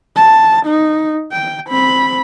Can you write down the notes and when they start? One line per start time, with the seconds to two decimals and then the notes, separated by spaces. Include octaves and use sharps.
0.16 A5
0.66 D#4
1.32 G5
1.68 C4 B5